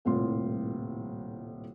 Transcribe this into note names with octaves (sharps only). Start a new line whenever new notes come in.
D#1 C2 A2 F4 C6